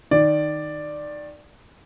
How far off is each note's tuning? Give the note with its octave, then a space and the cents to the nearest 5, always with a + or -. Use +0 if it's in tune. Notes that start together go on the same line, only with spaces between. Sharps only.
D#3 -10 D5 +5